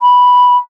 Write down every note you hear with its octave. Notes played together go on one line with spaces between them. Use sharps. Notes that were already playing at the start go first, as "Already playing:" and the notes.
B5